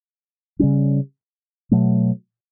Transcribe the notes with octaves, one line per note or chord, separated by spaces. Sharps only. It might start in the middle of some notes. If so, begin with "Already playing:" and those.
C#3 G3 C#4
B2 F#3 A3